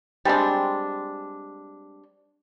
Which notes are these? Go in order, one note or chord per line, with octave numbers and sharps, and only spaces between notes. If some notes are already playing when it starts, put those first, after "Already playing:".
G3 G#3 C4 D4